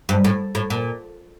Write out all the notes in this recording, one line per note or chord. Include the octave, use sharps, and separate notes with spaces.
G2
A2
A2
A#2